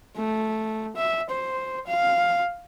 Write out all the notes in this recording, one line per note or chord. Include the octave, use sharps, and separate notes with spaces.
A3
E5
C5
F5